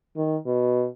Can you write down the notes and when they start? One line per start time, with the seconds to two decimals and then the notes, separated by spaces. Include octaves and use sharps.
0.17 D#3
0.46 B2